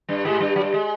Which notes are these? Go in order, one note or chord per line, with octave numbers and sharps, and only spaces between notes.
G2 G3
G#2 G#3
G2 G3
F#3
G3
G#3